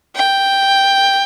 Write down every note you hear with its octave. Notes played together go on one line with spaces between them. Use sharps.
G5